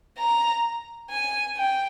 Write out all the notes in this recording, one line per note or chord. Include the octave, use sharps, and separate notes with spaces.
A#5
G#5
G5